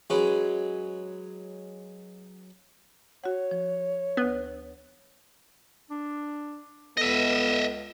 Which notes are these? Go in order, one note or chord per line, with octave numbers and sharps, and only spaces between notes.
F#3 G#3 C#4 G#4 B4
F#4 C#5 F#5
F3
D2 B3 B4
D4
C#2 B3 A4 D#5 E5